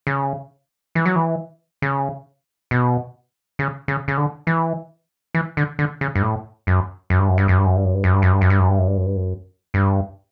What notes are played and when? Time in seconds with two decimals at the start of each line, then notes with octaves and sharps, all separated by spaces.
0.07 C#3
0.95 E3
1.06 F#3
1.16 E3
1.82 C#3
2.71 B2
3.59 C#3
3.88 C#3
4.08 C#3
4.17 D3
4.47 E3
5.35 E3
5.57 D3
5.79 D3
6.01 C#3
6.15 G2
6.22 A2
6.67 F#2
7.10 F#2
7.19 G2
7.29 F#2
7.38 G2
7.48 F#2
7.58 G2
7.66 F#2
7.76 G2
7.84 F#2
7.94 G2
8.04 F#2
8.13 G2
8.22 F#2
8.32 G2
8.41 F#2
8.50 G2
8.59 F#2
8.69 G2
8.78 F#2
8.87 G2
8.97 F#2
9.06 G2
9.16 F#2
9.74 G2